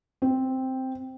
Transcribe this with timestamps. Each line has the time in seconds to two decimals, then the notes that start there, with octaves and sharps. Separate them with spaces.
0.22 C4